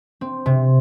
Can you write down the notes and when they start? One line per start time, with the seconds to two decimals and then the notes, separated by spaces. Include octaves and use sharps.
0.21 C4
0.46 C3